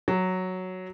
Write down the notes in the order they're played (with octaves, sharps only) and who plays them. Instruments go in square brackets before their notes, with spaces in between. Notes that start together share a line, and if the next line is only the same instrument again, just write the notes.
[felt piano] F#3